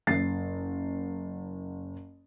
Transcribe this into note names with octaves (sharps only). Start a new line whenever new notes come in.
F#1 A6 C7